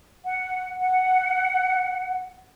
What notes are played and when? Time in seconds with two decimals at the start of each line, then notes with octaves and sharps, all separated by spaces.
0.25 F#5
0.79 F#5